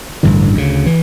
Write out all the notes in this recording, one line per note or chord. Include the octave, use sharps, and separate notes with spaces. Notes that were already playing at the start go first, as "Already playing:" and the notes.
A1 G2 D3 E3
D2 C#3
E3